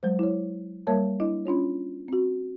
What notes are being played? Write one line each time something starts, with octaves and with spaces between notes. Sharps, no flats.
F#3 G#3 C5
E4 C#5
G3 A#3 A#4 C#5 E5 A5
D4 E4 D#5
C#4 D4 F4 C#5
C4 F#4